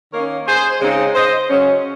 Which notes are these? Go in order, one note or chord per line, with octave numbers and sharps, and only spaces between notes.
D#3 A#3 C#4 A#4 C#5
G#4 C5
C#3 G#3 C4 D#4
C5 D#5
C#3 F#3 C#4